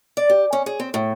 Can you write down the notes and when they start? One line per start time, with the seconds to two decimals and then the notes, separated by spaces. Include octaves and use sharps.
0.17 D5
0.30 G4
0.53 C#4
0.66 G#4
0.80 C4
0.94 A2